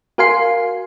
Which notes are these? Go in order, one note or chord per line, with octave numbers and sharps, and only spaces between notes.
F#4 A#4 F5 G#5 C6 C7